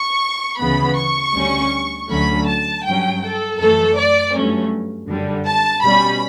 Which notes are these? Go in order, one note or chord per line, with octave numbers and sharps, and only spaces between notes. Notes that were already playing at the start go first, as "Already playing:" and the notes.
Already playing: C#6
D2 C#3 E3 B3 B5
C#6
D2 D3 G3 C#4
D2 D3 F#3 A3 C#4 B5
A5
G2 F#3 C#4 G5
A4
F#2 E3 A3 A4
D5
G2 F#3 A3 C#4
F#2 D3 G3
A5
B2 G3 C#4 B5